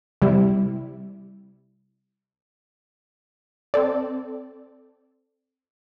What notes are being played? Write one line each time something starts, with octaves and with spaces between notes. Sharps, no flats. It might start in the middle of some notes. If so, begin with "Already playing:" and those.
C3 G3 E4
C4 A4 D5